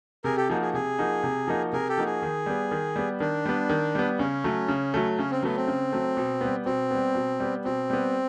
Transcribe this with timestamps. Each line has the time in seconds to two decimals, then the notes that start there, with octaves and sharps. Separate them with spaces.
0.24 C3 G#4 A#4
0.37 G4 A4
0.49 F3 A#3 D#4 F#4 G#4
0.62 G#4
0.74 C3 G#4
0.99 F3 A#3 D#4 F#4
1.23 C3
1.47 F3 A#3 D#4 F#4
1.73 C3 G#4 A#4
1.89 G4 A4
1.98 F3 A#3 D#4 F#4
2.05 G#4
2.22 D#3
2.46 G3 B3
2.71 D#3
2.96 G3 B3
3.20 D#3 D4
3.46 G3 B3
3.69 D#3
3.95 G3 B3
4.19 C#3 C#4
4.44 F#3 A3
4.68 C#3
4.94 F#3 A3
5.18 C#3 C#4
5.31 C4
5.43 F#3 A3 B3
5.57 C4
5.67 C#3
5.92 F#3 A3
6.17 B2
6.41 G3 B3
6.66 B2 C4
6.91 G3 B3
7.15 B2
7.40 G3 B3
7.65 B2 C4
7.90 G3 B3